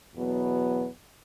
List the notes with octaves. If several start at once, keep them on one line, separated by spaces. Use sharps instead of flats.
E2 B2 F#3 B3